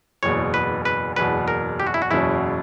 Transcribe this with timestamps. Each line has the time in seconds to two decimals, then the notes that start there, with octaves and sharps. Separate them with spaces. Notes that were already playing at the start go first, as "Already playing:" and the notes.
0.23 F#1 E2 B2 C#5
0.54 B4
0.85 B4
1.16 F#1 E2 B2 B4
1.48 A#4
1.80 G4
1.87 F#4
1.94 E4
2.02 F#4
2.11 F#1 E2 B2 F#3 C#4 E4